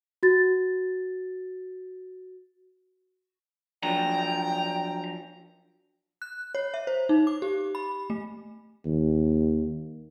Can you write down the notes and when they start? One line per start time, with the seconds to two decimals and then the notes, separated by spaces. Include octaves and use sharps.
0.23 F#4 A6
3.83 F3 F#3 D4 G5 A#5
6.22 F#6
6.55 C#5
6.74 E5
6.87 C5
7.09 D#4
7.27 D6
7.42 G4
7.75 B5
8.10 A3
8.85 D#2